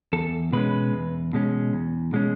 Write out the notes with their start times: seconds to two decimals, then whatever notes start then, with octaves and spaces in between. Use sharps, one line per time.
0.13 E2 A4
0.52 B2 G#3 C#4 B4
0.93 E2
1.33 B2 G#3 C#4
1.73 E2
2.13 B2 G#3 C#4